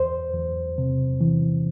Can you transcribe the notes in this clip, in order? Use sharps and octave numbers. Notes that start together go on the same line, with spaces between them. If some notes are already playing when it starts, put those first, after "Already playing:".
Already playing: E2 C5
E2
C3
E3